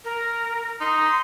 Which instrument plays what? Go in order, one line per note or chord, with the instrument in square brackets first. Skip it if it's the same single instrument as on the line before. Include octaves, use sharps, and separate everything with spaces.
[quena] A#4
[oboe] D#4 [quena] C6
[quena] C6